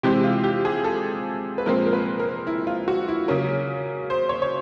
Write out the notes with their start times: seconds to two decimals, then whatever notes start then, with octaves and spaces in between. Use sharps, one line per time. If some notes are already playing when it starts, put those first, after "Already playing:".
0.03 C3 E3 G#3 C4 G4
0.24 F4
0.44 G4
0.65 G#4
0.84 A4
1.58 B4
1.66 A#2 F3 G#3 C4 A#4
1.86 A#4
1.93 B4
2.19 A#4
2.47 E4
2.67 F4
2.88 F#4
3.08 E4
3.28 C#3 F#3 A#3 C#4 A#4
4.10 C5
4.29 C#5
4.42 C#5